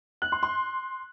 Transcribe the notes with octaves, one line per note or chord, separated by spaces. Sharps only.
F#6
C6
C6